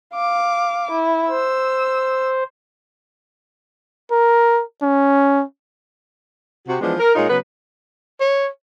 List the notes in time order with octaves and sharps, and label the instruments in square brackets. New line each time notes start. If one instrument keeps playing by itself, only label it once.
[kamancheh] F5 D6
E4
[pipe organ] C5 [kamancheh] E6
[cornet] A#4
C#4
[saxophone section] C3 F#4
E3 F3 G#3 B3 D4
A#4
A#2 G#3 D#4 F4 A#4 C#5
C#3 F#3 B3 B4
[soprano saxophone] C#5